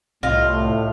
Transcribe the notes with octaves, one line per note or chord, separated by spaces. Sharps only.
C2 A2 F4 D#5